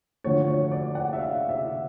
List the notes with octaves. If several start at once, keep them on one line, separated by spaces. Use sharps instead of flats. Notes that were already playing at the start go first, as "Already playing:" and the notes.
D3 F3 A3 C#5
C#5
D5
F#5
E5
F5
E5